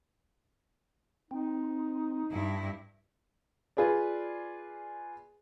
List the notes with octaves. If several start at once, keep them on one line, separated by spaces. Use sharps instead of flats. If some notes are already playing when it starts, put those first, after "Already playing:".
C4 D#4
G2 E4
F4 G#4 B4 D5